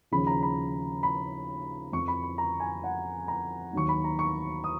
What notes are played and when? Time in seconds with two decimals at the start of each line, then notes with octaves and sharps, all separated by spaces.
0.12 D#2 C#3 F3 B5
0.27 A#5
0.42 B5
1.03 B5
1.92 F2 F3 C#6
2.08 B5
2.23 B5
2.38 A#5
2.60 G#5
2.84 F#5
3.28 A#5
3.73 D#2 D#3 F#3 C#6
3.89 B5
4.04 A#5
4.19 C#6
4.64 D#6